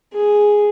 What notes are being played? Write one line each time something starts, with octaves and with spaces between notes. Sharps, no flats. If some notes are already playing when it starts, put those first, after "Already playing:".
G#4